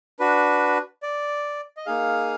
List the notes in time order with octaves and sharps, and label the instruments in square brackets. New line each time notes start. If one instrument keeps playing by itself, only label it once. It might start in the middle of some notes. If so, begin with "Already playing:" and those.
[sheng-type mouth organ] D4 F#4 B4
D5
D#5
A#3 D#4 G#4 F5